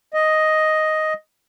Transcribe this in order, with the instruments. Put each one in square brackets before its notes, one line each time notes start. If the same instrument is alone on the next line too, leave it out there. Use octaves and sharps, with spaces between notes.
[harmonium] D#5